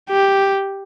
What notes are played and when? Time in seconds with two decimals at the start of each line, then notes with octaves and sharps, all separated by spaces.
0.09 G4